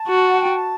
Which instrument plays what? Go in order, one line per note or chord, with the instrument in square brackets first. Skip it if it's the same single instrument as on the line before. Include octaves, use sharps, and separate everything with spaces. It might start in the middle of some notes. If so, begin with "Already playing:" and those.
Already playing: [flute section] A5
[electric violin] F#4
[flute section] F#5
G5
A5